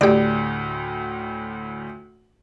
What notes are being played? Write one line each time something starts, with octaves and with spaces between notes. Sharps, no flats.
D2 A2 G4 D5